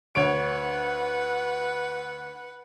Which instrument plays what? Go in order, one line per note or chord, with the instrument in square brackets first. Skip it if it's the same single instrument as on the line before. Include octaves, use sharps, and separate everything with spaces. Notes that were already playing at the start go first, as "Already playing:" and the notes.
[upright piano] D2 C#5 D7 [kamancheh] B4 F#5